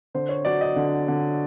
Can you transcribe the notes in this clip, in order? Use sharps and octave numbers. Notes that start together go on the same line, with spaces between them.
D3 C5
C#5
F#3 D5
D#5
D3
D3